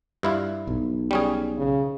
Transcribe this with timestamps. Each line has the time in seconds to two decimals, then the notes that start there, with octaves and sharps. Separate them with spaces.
0.23 G2 E4 F4
0.67 B1
1.11 G3 C#4 G#4
1.57 C#3